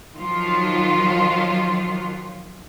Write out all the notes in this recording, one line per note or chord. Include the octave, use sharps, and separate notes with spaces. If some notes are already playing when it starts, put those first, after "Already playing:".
D#3 F3 F#3 F4